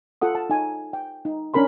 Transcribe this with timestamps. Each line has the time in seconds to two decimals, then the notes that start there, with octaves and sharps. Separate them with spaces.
0.22 F4 A4 F#5 D#6
0.35 A5
0.50 D#4 G#5
0.93 G5
1.25 D#4
1.54 C#4 D4 A#4 B5 C6